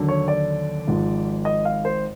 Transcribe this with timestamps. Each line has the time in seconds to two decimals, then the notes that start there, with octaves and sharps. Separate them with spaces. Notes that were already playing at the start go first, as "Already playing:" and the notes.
Already playing: D#2 D3 F#3
0.08 C#5
0.28 D5
0.87 G#1 G#2 F3
1.45 D#5
1.65 F5
1.85 C5